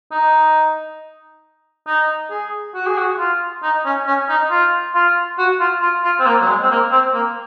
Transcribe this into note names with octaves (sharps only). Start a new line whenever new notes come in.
D#4
D#4
G#4
F#4
G#4
F#4
F4
D#4
C#4
C#4
D#4
F4
F4
F#4
F4
F4
F4
C4
A#3
F#3
G#3
C4
A#3
C4
A#3